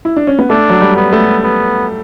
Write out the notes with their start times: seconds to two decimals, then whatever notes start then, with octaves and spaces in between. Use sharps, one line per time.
0.05 E4
0.16 D4
0.27 C#4
0.39 B3
0.50 A3 D4
0.70 F#3
0.82 G3
0.96 B3
1.13 A3
1.44 B3